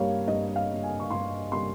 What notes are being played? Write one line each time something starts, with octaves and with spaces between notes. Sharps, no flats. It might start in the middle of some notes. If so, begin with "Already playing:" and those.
Already playing: G2 G3 A#3 C#5 F5
G2 D#5
F5
G3 A#3
G#5
C#6
G2 C6
G3 A#3 C6